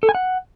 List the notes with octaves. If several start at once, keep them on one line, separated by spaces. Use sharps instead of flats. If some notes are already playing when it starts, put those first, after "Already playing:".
A4
G#5
F#5